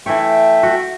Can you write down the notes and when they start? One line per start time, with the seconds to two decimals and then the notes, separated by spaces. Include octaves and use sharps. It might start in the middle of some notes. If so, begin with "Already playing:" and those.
0.06 E3 A3 C#5 E5 G5
0.63 F#4